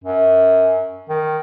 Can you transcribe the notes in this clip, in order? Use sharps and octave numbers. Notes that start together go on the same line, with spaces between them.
F#2
D#3